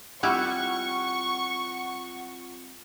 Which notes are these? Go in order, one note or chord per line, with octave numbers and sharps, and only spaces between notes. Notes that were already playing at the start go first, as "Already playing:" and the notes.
G3 C4 E4 F4 F#5 C#6